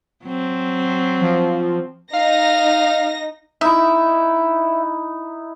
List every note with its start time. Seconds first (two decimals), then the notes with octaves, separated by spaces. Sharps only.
0.24 F#3 C4
1.21 F3
2.14 D#4 F5 A#6
3.61 D#4 E4 E5